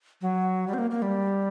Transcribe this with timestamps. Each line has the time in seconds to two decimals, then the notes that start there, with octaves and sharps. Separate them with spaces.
0.22 F#3
0.67 G3
0.74 C4
0.78 A#3
0.91 A#3
1.02 G3